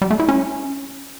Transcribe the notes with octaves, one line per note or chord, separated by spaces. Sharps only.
G3
A3
E4
C#4